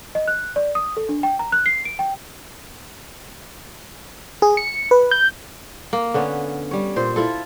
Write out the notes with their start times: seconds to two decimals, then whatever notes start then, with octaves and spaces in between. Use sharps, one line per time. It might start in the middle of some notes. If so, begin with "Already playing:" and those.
0.15 D#5
0.28 F#6
0.56 D5
0.75 D#6
0.97 A4
1.09 D4
1.23 G5
1.39 A#5
1.52 F#6
1.66 C7
1.85 D7
1.99 G5
4.42 G#4
4.57 C#7
4.91 B4
5.11 G6
5.93 A#3
6.14 D3 B3 C#4
6.71 G3 C#5
6.96 A#2 C5
7.16 E4 F4 A4